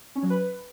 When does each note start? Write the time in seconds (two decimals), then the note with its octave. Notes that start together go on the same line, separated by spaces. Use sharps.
0.15 C#4
0.23 F#3
0.30 B4